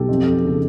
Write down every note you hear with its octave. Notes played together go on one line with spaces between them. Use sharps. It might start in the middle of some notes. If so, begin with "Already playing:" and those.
Already playing: B1 G4 A4
F2
F2
C#3